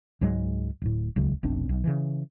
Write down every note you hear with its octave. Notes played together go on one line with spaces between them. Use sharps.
C#2 G#2 F#3 G#3
D1 A2
D#1 C#2 C#3 F#3
F1 B1 C4 D4
B1
C#3 E3